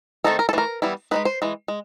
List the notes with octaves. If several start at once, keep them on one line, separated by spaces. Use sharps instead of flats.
D#3 F#3 A3 C4 D#4 A4
A#4
A4
E3 A3 D4 A#4
E3 G3 B3 E4
G#3 C4 D#4 B4
C5
E3 G#3
G#3